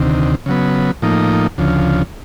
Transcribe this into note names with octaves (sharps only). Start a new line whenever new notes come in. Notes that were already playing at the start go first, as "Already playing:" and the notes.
Already playing: D2 C3 D#3
C#3 F#3 B3
A2 F3 A#3 D#4
D2 C#3 F3